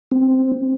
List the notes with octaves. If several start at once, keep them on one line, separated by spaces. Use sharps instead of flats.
C4